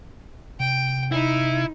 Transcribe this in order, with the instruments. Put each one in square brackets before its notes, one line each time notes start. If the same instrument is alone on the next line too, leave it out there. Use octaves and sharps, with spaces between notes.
[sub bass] C3 [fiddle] G5
[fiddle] D#4 [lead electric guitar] E4